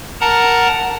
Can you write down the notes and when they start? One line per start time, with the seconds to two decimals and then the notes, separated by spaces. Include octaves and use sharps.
0.21 A#4 F#5 A5 A#5